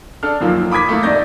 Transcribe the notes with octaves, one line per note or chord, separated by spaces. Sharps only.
D4 A4 F6
F#2 D#3 F3 A#3
B5 D6 D#6 G#6 B6
A3 A#3 E4
C2 G2 D#4 D5 G6 A#6